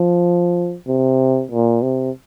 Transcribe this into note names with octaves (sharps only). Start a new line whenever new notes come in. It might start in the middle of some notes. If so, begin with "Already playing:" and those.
Already playing: F3
C3
A#2
C3